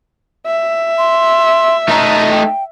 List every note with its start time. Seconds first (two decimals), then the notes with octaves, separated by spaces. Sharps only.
0.47 E5
0.98 C6
1.89 A3 D#4 A#5
2.31 G5